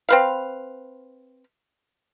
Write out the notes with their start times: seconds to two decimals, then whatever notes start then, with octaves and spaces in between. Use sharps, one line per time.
0.09 C4 B4 F5